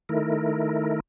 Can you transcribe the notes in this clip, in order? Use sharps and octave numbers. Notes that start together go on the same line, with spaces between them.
D#3 A3 E4 A#4